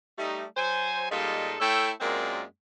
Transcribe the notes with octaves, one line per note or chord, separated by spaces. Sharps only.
G3 A3 D#4
F#3 C5 G#5
A#2 G3 G#3 D#4 F4 A4
A3 E4 A4 C#5 G5
F#2 G#3 A#3 C4 F4 D5